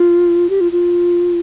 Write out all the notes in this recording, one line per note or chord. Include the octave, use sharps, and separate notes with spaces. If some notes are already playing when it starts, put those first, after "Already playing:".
Already playing: F4
G4
F4
F4